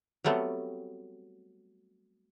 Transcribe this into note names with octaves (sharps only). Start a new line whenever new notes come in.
F#3 G3 A3 B3 C4